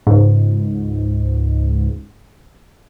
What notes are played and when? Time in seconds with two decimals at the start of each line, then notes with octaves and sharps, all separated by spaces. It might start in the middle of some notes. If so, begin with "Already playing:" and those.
0.07 C#2 G#2